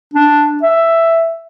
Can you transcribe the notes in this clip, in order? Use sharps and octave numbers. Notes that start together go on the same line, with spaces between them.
D4
E5